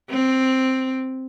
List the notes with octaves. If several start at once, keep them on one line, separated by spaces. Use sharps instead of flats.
C4